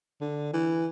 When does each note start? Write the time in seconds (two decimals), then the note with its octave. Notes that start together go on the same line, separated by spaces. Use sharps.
0.21 D3
0.53 E3